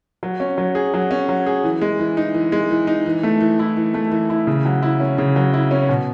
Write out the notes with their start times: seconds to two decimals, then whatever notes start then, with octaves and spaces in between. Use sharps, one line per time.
0.23 F#3
0.40 C#4
0.58 F#3
0.75 G#4
0.94 F#3
1.11 C#4
1.29 F#3
1.46 G#4
1.64 E3
1.81 G#3
1.99 E3
2.17 D#4
2.34 E3
2.52 G#3
2.71 E3
2.87 D#4
3.06 E3
3.23 A3
3.41 E3
3.59 E4
3.77 E3
3.94 A3
4.12 E3
4.30 E4
4.47 C#3
4.65 F#3
4.83 E4
5.00 C#4
5.18 C#3
5.36 F#3
5.54 E4
5.71 C#4
5.89 B2